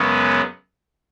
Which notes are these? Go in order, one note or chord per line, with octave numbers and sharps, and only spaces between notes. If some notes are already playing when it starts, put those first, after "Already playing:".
Already playing: F#2 C#3 G#3 B3